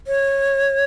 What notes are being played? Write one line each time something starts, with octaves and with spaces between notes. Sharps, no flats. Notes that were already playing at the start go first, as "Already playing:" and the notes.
C#5